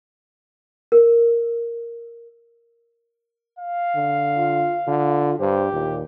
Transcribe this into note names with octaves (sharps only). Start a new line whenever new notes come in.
A#4
F5
D3
F4
D3 F4
G2 G4 C5
D#2 A#2